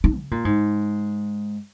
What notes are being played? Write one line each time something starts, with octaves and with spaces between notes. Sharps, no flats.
D#4
C#3
A#2
G#2